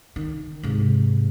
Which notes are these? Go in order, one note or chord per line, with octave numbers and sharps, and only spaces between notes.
D#3
G#2 C3